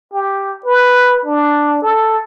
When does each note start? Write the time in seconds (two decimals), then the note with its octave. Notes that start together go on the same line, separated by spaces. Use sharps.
0.13 G4
0.66 B4
1.25 D4
1.82 A4